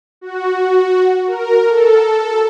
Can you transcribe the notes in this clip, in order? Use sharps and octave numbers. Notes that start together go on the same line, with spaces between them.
F#4
A#4
A4